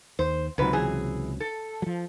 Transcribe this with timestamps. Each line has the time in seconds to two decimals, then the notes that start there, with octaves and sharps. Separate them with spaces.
0.19 D#2 C5
0.58 C#2 G#2 C3 F#3 B4
0.73 E3 G#4
1.40 A4
1.82 F3 F#3